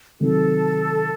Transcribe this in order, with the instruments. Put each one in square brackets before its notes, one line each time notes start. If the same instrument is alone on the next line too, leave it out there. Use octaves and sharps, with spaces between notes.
[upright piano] C3 D#3 F#3 [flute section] A4